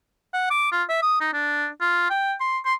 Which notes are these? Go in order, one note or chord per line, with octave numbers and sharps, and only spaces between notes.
F#5
D6
F4
E5
D#6
D#4
D4
F4
G5
C6
C6